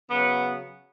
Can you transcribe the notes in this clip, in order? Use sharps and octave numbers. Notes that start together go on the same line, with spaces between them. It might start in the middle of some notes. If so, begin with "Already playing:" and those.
C#3 F#3 B3